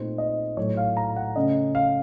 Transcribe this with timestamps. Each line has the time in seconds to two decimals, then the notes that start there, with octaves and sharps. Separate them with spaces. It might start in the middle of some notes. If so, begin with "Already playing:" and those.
Already playing: A#2 A3 C4 D#4 C5
0.18 D#5
0.57 A2 F#3 A3 C#5
0.77 F5
0.97 A#5
1.16 F#5
1.36 C#3 A3 C#4 D#5
1.75 F5